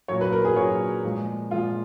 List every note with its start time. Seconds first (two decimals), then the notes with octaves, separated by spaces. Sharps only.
0.08 A#2 F#3 C#5
0.21 B4
0.32 A#4
0.45 G#4
0.56 A#2 F#3 C#5
1.03 A#2 F3 G#3
1.51 A#2 F3 G#3 F4